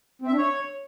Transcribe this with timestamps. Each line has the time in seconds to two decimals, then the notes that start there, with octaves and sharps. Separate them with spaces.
0.22 C4
0.27 E5
0.32 D4
0.38 C#5